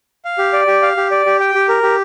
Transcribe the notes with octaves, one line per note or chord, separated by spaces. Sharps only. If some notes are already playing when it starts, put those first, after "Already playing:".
F5
G4
D5
G4
F5
G4
D5
G4
G5
G4
A#4
G4